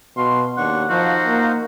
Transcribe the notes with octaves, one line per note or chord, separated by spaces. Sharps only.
B2 F#4 F5 C6
D#2 D4 F#5 C#6
F3 D#4 F#4 C5 F5
A#3